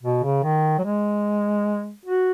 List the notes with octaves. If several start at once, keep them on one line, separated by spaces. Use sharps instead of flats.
B2
C#3
D#3
F#3
G#3
F#4